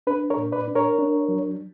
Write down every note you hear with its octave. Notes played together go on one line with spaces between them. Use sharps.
D4 B4
A#4 C#5
A#2
B4 D5
D4
A#4 C#5
D4
F#3